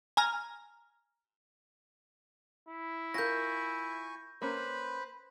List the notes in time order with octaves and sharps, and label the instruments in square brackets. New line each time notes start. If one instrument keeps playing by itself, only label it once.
[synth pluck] G#5 A#5 F6
[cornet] E4
[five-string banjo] F4 A#4 [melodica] G#5 C#6 [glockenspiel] G6 A#6
[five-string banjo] A#3 C#4 [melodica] B4 C5 B5